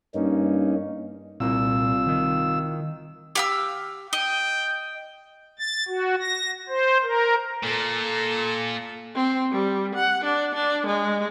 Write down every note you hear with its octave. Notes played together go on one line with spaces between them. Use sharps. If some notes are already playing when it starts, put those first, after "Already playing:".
G2 A#3 C#4 D#4
C2 A#2 F4 E6
D#3
G4 F5 E6
D#5 G5
A6
F#4
A#6
C5
A#4
A#2 A4
C4
G3
F#5
D4
D4
G#3